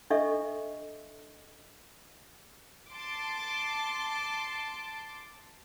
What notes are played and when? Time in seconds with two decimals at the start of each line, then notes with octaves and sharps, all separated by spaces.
0.10 D4 A4 D#5 E5 C#6
2.91 A5 C6 D6